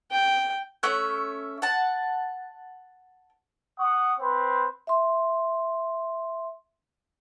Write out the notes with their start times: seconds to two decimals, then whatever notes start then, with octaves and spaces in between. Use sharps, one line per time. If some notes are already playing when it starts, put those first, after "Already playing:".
0.12 G5
0.83 A3 C#4 E5 F#6
1.62 F#5 A5
3.78 F#5 C#6 D#6
4.19 C4 B4 C5
4.87 E5 C6